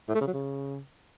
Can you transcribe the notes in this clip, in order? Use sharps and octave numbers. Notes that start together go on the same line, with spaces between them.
A2
A3
C#3
F#3
C#3